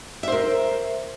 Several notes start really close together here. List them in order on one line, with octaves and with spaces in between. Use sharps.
E5 C5 A#4